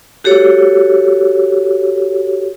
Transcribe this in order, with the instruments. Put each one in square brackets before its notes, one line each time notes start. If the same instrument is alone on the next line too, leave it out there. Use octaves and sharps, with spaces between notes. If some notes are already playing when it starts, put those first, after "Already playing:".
[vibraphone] F#4 G4 A4 C#5